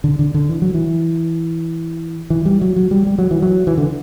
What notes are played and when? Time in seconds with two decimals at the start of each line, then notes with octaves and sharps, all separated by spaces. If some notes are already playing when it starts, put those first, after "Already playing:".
0.04 D3
0.19 D3
0.34 D3
0.49 E3
0.62 F#3
0.74 E3
2.30 E3
2.45 G3
2.61 F#3
2.76 F#3
2.91 G3
3.07 G3
3.18 F#3
3.31 E3
3.42 F#3
3.67 E3
3.78 D3